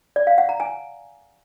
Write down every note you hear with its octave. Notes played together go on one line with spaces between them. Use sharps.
D5
F5
F#5
A#5
G#5